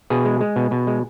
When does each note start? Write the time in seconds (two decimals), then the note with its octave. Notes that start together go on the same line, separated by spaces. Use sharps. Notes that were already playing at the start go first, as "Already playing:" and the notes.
0.10 B2 G#4
0.25 G#3
0.40 G#3
0.56 B2
0.71 B2
0.87 G#3